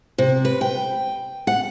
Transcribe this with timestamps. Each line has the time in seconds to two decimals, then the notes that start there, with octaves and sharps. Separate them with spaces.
0.18 C3
0.45 B4
0.61 G5
1.47 F#5